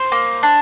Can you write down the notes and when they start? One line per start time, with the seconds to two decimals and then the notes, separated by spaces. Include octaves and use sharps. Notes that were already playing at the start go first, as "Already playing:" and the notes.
Already playing: C5
0.12 A#3
0.43 D4